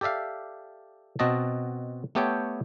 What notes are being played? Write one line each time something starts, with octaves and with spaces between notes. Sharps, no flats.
G4 A4 D5 E5 F5
B2 C4 F#4 D#5 A5
A3 B3 G4 A4 C#5 G5